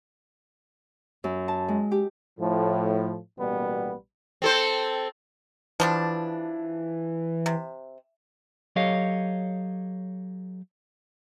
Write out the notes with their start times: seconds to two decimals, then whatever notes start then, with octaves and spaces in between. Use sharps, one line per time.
1.24 F#2
1.48 A5
1.68 G#3
1.92 G4
2.39 A2 F3
3.38 A1 B2 G3 A#3 B3 B4
4.42 C4 A4 C5
5.80 E3 F3 G3 D4
7.46 C3
8.76 F#3 G4 A4 C#5 D#5 F5